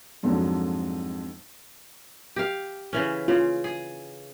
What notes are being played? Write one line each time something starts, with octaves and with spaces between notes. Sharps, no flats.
F2 G#2 D3 F#3
G4 F5
C#3 E3 C#4
C#3 F4
G#4